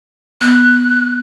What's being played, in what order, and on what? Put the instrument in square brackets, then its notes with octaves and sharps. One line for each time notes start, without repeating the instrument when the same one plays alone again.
[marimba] B3 [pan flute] F#6